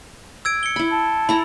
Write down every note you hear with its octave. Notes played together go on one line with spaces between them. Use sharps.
E6 G#6 D7
C#7 G7
E4 B5
A5
E4 A4 A#5 B5